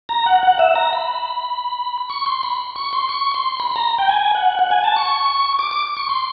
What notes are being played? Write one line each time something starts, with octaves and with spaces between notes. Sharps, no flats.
A#5
F#5
F#5
E5
A#5
B5
C#6
C6
B5
C#6
C6
C#6
C6
B5
B5
A#5
G5
G#5
F#5
F#5
G#5
A5
C#6
D6
D6
C#6
C6